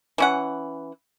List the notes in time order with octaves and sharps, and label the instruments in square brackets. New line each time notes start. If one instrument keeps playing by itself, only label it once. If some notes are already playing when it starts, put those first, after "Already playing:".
[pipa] E3 C#4 F#5